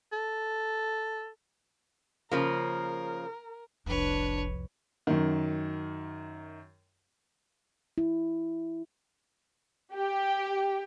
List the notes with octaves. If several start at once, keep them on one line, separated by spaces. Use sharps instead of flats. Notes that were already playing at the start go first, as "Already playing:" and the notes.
A4
C#3 F3 A#3 A#4
F1 C2 F2 D4 B4 C#5
F#2 D#3
E4
G4